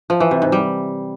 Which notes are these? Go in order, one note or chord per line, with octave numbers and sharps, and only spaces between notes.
F3
E3
C3
G#2
G3